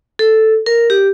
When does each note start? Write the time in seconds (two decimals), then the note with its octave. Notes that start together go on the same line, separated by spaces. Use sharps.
0.19 A4
0.66 A#4
0.90 G4